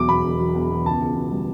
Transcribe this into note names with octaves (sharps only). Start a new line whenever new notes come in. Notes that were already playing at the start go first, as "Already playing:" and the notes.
Already playing: E1 E2 F#3 D6
B2 B5
E1
F#3
E2
B2
C#2 A5
C#2
B2
G3